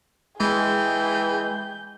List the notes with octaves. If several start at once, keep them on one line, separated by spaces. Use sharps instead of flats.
E3 G#3 G#4 G5 G6